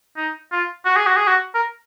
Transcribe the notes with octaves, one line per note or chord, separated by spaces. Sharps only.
D#4
F4
F#4
G#4
F#4
G#4
F#4
A#4